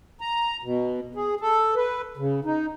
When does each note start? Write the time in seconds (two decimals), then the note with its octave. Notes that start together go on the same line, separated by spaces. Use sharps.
0.21 A#5
0.63 B2
1.15 G#4
1.40 A4
1.76 B4
2.17 C#3
2.45 D#4